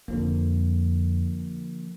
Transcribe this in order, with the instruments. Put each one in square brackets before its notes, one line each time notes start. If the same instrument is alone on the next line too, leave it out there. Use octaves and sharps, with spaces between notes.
[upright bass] F2 [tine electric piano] D3 F3 A#3